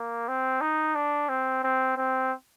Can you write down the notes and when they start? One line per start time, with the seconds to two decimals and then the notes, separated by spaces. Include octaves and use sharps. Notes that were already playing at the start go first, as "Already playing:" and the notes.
Already playing: A#3
0.28 C4
0.61 D#4
0.95 D4
1.29 C4
1.64 C4
1.97 C4